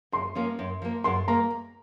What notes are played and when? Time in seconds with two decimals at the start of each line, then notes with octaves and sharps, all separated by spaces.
0.12 F#2 C6
0.35 F3 A#3 C#4
0.59 F#2
0.82 F3 A#3
1.04 F#2 C6
1.28 A#3 A#5